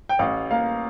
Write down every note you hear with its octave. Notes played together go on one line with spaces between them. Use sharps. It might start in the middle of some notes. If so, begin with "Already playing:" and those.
G5
A1 F5
A#3 F5